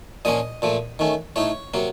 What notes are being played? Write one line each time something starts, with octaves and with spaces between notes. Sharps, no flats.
A#2 F3 A#3 C#4 D#5
A#2 F3 A3
D#3 A3 C#4
A2 A3 D#4 C#5
C3 F#3 A#3